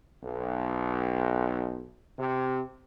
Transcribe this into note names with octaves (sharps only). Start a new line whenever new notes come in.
B1
C3